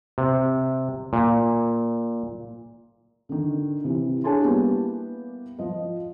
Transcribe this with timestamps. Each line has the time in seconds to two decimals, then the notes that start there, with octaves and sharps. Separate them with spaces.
0.18 C3
1.13 A#2
3.29 D3 D#3
3.84 C3 E3 E4
4.24 D4 G#4 C#5 G#5 A5 C6
4.42 G3 A#3 B3 E4 G4
5.59 F3 D#5